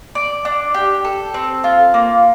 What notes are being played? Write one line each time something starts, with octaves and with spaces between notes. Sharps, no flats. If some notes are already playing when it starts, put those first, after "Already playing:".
D5
D4
G4
A4
C4
F4
A#3